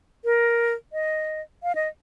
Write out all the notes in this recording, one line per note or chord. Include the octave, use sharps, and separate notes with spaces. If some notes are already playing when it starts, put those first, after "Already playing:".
A#4
D#5
F5
D#5